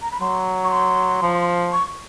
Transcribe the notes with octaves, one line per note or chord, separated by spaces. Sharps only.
A#5
B5
F#3 C6
C#6
C6
F3
C#6